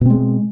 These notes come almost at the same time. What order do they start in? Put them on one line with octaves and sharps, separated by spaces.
B2 C4 G#3